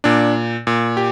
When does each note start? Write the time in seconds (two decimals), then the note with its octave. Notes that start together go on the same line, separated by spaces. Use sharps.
0.04 A#2 D4
0.67 A#2
0.97 G4